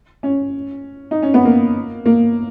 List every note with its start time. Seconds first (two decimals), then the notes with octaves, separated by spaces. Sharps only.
0.23 C#4
1.11 D#4
1.23 C#4
1.34 B3
1.45 A#3
2.06 A#3